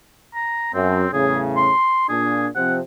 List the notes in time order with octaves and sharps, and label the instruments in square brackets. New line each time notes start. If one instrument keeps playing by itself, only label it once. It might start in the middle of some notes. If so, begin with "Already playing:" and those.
[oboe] A#5
[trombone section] F#2 [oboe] C4
[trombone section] E2 A2 C#3 [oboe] G#4
[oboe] C6
[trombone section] A#2 D4 [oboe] G#4
[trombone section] C3 F3 C4 [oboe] F#5